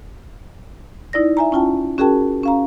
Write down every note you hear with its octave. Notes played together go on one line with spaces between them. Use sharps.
D#4 E4 D5 A#6
E5 G#5 A#5
C#4 E4 F4 G5 A5
C#4 F#4 G#4 A#4 G5 A5
C#4 F5 A#5